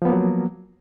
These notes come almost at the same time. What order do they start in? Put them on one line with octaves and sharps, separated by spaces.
F3 B3 A#3 F#3